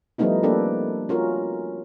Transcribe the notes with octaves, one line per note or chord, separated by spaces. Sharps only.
F3 G3 A3 B3 D#4 E4
A#3 C4 D4 G4 A4 B4
C#4 F4 F#4 A#4